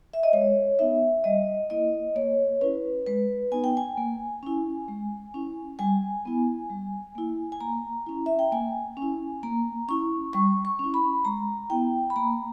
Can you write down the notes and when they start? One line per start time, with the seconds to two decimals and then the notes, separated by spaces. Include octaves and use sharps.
0.14 E5
0.23 D#5
0.33 G#3 C#5
0.79 B3 D#4 E5
1.24 G3 D#5
1.70 A#3 E4 D#5
2.15 A#3 C#5
2.61 C#4 E4 B4
3.06 G#3 B4
3.52 B3 D#4 G#5
3.64 G5
3.77 G#5
3.98 A#3
4.43 C#4 E4
4.88 G#3
5.34 C#4 E4
5.79 G3 G#5
6.25 B3 E4
6.70 G3
7.15 A#3 E4
7.52 G#5
7.61 A#3 A#5
8.06 C#4 E4
8.26 E5
8.39 G5
8.52 A#3 G#5
8.97 C#4 E4
9.43 A#3 A#5
9.88 C#4 E4 C#6
10.33 G3 C#6
10.65 C#6
10.79 C#4 E4
10.94 B5
11.25 G#3 A#5
11.70 B3 E4 G5
12.10 B5
12.16 A#3 A#5